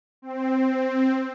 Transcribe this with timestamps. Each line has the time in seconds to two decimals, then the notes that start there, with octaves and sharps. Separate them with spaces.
0.22 C4